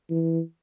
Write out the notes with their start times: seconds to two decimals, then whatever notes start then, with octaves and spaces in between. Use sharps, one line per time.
0.10 E3